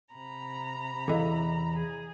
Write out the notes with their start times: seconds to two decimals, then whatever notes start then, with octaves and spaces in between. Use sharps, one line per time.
0.14 C3 A#5 B5
1.08 E2 E3 A4 D#5 F5
1.76 G#4